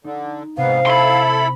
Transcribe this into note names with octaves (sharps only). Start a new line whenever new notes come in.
D3 D#4
G#2 C3 B3 F5
E4 A4 B5 C6